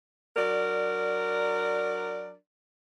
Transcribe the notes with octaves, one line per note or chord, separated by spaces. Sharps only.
F#3 D4 A#4 D5